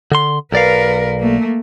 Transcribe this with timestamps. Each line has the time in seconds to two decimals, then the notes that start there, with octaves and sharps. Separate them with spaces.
0.12 D3 C6
0.52 B1 A#4 B4 D5 F5
1.19 A3 A#3